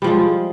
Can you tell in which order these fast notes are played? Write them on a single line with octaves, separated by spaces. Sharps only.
G3 F3 G#3